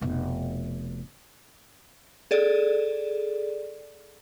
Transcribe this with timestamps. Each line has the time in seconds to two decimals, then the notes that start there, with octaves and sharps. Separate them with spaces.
0.01 F1 B2
2.31 G#4 A4 D5